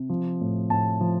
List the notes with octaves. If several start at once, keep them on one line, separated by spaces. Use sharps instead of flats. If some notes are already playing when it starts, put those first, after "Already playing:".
Already playing: C3
F3
A2
A2 A5
F3